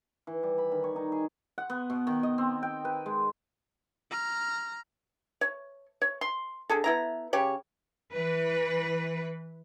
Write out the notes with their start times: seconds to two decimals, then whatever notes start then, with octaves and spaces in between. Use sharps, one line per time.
0.27 E3
0.43 G3
0.58 B5
0.72 D#3
0.84 C#5
0.96 D#4
1.12 G#4
1.58 F#5
1.70 B3
1.90 B2
2.07 D#3
2.23 D#5
2.38 C4
2.63 G5
2.85 B4
3.06 G#3
4.11 A#5 F6
5.41 C#5
6.02 C#5
6.21 C6
6.70 D3 G#4 A4
6.84 B3 E4 A#5
7.33 C#3 G4 C#5
8.13 E3 B4